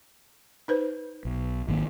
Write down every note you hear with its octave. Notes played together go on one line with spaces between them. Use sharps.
D#4 B4 C5
B1
G#1 D#3 A#3